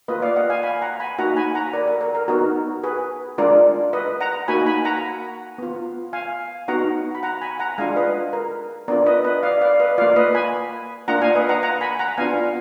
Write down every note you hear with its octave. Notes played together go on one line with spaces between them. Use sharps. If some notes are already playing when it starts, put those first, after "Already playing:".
A#3 F4 B4 D#5
D5 F5
D#5 F#5
F5 G#5
G#5 B5
F#5 A#5
G#5 B5
A#3 D#4 F#4 F#5 A#5
G#5 B5
F#5 A#5
A#4 D5
A#4
A#4
A#4
B3 D#4 F#4 A#4
G#4 B4
G#3 D4 F4 A#4 D5
B4 D#5
F#5 A#5
A#3 D#4 F#4 G#5 B5
G#5 B5
F#5 A#5
B3 F4
F5 G#5
B3 D#4 F#4 F#5 A#5
B5
F#5 A#5
G#5 B5
F#5 A#5
G#3 D4 F4 F5 G#5
B4 D#5
A#4
B3 D4 F4 A#4 D5
B4 D#5
B4 D#5
D5 F5
D5 F5
B4 D#5
A#3 F4 D5 F5
B4 D#5
G#5 B5
A#3 D4 F4 F#5 A#5
F5 G#5
B4 D#5
F#5 A#5
F#5 A#5
G#5 B5
F#5 A#5
B3 D4 F4 F5 G#5